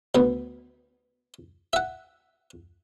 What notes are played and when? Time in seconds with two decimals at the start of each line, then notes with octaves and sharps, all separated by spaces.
0.15 D2 B3
1.73 E5 F#5